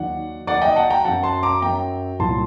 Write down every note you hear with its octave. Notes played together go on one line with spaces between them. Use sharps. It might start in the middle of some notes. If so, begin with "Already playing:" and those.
Already playing: D#2 D#3 F#3 D5 F#5
D#2 D#3 F#3 D5 F#5
D#5 G5
F#5 A5
G5 A#5
F#2 F#3 F#5 A5
A5 C6
A#5 D6
F#2 F#3 G5 A#5
C2 A#2 F#3 A5 C6